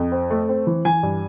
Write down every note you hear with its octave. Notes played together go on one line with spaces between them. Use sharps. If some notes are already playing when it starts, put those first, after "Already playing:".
Already playing: F2
C4
A3
C4
E3
E3 G#5
G2